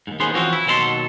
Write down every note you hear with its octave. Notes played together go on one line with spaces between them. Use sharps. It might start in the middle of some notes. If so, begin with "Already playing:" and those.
D#2 G#2
D#2 B3 C#4 G#4 C5 C6
E3 F3 C4 C#4 F#4
E4
D#2 B2 F#3 A4 A#5 C6